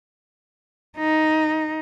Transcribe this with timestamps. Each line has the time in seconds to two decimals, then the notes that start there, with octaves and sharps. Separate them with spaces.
0.98 D#4